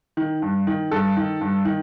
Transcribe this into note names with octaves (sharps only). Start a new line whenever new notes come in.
D#3
G2
D#3
G2 A4
D#3
G2
D#3